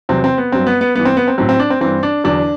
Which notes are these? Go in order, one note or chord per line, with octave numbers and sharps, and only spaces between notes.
E2 C3 F#3 C4
C4
B3
G2 F#3 C4
B3
B3
G2 E3 B3
C4
B3
C4
A2 F#3 C4
C4
D4
C4
G2 E3 C4
D4
E2 D3 F#3 D4